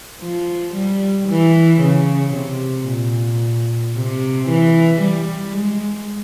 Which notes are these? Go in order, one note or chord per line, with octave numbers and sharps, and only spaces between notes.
F3
G3
E3
C#3
C3
A#2
C3
E3
G3
G#3